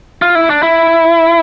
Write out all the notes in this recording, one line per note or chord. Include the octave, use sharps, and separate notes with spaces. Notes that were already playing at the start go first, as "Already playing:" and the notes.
F4
E4
D4
E4